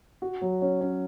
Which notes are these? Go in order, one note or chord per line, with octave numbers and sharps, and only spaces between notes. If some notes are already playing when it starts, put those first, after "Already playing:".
F#4
F#3
C#4
C#4